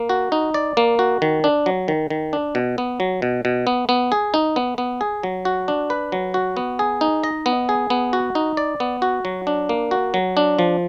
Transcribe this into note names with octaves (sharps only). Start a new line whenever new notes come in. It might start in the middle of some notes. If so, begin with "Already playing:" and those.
Already playing: A#3
F#4
D#4
D5
A#3
F#4
D#3
D4
F#3
D#3
D#3
D4
B2
B3
F#3
B2
B2
B3
B3
G#4
D#4
B3
B3
G#4
F#3
F#4
D4
B4
F#3
F#4
B3
G#4
D#4
D#5
B3
G#4
B3
F#4
D#4
D5
B3
F#4
F#3
D4
A#3
F#4
F#3
D4
F3